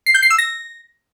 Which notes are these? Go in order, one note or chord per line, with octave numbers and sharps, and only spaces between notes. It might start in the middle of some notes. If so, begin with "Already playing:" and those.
C7
G6
C7
E6
A#6